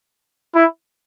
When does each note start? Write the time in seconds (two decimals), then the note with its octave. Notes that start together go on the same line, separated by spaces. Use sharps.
0.54 E4